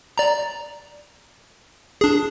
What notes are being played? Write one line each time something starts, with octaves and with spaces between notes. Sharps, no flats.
D5 A#5
D4 G#4